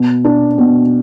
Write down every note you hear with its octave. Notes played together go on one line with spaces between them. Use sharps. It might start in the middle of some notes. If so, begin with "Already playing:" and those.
Already playing: B2
D4
B2